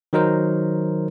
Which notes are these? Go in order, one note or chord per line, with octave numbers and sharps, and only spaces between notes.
D#3 F#3 D#4 A#4 C5